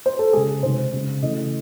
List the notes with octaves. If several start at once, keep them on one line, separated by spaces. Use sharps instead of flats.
C5
A4
C#3 G#3 G#4
C3 D#3 G#3 C5
C#3 G#3
C#3 E3 A3 D#5